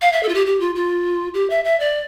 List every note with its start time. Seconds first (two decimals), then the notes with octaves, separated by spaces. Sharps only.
0.01 F5
0.12 E5
0.23 A4
0.29 F4
0.34 G4
0.46 G4
0.60 F4
0.75 F4
1.34 G4
1.50 E5
1.65 E5
1.80 D5